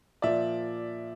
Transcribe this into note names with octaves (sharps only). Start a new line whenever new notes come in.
A#2 F3 D5 E5